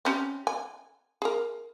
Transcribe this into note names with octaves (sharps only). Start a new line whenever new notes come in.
C4 C#4 G4
G#5
G#4 A#4